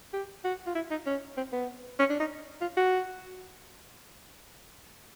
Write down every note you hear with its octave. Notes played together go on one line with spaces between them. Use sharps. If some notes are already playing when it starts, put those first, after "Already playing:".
G4
F#4
F4
E4
D#4
C#4
C4
B3
C#4
D4
D#4
F4
F#4